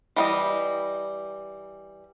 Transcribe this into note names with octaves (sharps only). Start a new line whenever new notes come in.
E3 G3 D#5